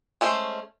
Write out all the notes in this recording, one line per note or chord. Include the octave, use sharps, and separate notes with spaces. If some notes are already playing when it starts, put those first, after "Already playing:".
G#3 A3 C#4 C5